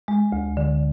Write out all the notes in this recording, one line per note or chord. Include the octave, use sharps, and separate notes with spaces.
G#3
D2
D3